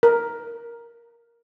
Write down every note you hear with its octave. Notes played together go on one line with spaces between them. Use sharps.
A#4